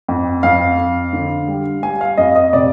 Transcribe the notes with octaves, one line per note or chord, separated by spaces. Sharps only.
F2
F2 F5
F2
D3
G3
G3 G#5
F5
F2 D#5
D#5
C3 D5